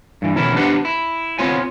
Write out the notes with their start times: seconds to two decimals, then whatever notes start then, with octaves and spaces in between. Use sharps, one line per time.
0.22 G2 E3
0.36 B2 D#3 E3 C#4 E4
0.55 B3 D4 G4 B4 C5 F#5
0.85 E4
1.39 B3 C4 F4 C#5 G#5